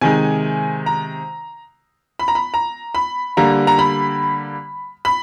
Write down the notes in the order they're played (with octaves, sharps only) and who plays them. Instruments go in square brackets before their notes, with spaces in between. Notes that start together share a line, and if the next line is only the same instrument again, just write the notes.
[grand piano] C3 D#3 G#3 G#5
A#5
B5
A#5
B5
A#5
B5
D3 G3 A#3 A#5
A#5
B5
B5